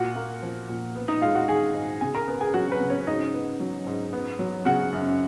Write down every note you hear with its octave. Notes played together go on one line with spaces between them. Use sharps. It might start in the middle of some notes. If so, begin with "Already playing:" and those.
Already playing: A#2 F#4 F#5
A#3
F3
A#2
B3
D#4 D#5
G#3 F4 F5
F#4 F#5
D#3 G#4 G#5
G#2
C#3 G#4 G#5
A#4 A#5
B3
G#4 G#5
F#3 F#4 F#5
B4
C#3
C#4 C#5
G#2 D#4 D#5
B3
F#3
G#2
B3
F#3
C#3 F#4 F#5
F#2